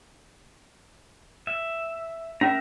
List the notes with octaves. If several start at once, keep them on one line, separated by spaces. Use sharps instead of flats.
E5
C#4 A#4 E5 A#5